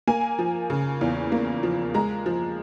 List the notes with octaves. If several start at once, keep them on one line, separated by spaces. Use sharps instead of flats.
A#3 G#5
F3
C#3
E2
A#3
F3
G#3 A#5
F3